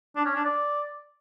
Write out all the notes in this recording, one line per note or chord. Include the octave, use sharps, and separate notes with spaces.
D4
C#4
D4
D5